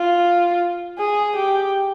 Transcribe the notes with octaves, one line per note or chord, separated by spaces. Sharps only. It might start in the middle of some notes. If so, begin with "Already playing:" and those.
Already playing: F4
G#4
G4